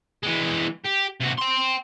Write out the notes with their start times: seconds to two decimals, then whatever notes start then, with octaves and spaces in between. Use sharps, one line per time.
0.23 E3 G#3
0.84 G4
1.20 C3 F#4
1.38 G5 C6